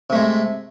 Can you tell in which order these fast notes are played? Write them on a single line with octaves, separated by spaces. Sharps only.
C3 A3 G#3